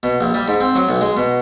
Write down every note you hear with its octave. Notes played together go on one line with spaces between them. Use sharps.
B2
A#1
G3
G#2
C4
F#3
B1
G#3
B2